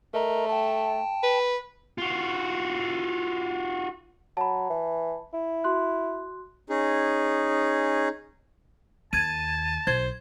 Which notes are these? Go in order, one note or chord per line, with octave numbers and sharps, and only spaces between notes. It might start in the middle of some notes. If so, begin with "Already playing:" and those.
A3 A#4 D#5 A#5
G5 A5
B4
F4 F#4
F#3 A5 B5
E3
E4
F#4 C6 F#6
C#4 D#4 G#4
D#2 A5 G#6 D#7
B1 C5 G#6